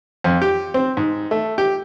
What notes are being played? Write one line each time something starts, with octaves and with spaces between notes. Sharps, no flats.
F2
G4
C4
G#2
A3
G4